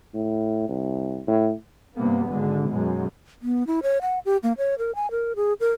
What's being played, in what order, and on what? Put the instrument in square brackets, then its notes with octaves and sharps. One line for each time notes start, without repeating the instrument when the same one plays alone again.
[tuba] A2
C2
A2
[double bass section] G2 C3 A#3 B3
G#1 D3 G#3
F#2 B2 G#3
[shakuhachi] B3
E4
C#5
F#5
G4
A#3
C#5
A#4
G#5
A#4
G#4
A#4